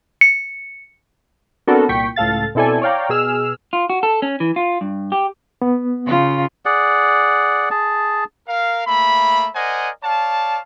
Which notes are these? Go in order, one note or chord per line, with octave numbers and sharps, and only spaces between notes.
C#7
B3 C4 D4 F#4 A4 A#4
C2 A#2 G5 C#6 B6
C#2 A2 A4 F5 A6
B2 C4 E4 A4 D5 G#5
C#5 D5 F5 G5 A#5
B2 G#4 E6 F6
F4
F#4
A4
C#4
E3
F4
G2
G4
B3
C#3 F4
G#4 D5 F#5
G#4 A5
A#4 F5
A3 A#3 E5 B5
A#4 C5 D5 D#5 F#5 G#5
C#5 D5 F5 A5